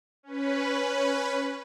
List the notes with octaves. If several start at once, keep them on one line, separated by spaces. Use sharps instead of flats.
C#4 B4